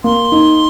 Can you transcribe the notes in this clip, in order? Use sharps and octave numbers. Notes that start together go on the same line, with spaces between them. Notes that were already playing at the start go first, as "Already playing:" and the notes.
A#3 C6
D#4